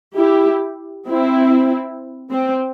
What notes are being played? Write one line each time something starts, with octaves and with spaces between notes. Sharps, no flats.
E4 G4
C4 E4
C4